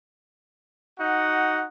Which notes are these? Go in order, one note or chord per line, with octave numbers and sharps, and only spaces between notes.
D#4 F#4 F#5